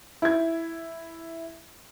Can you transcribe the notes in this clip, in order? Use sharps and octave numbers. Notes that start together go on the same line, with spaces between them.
E4 G#6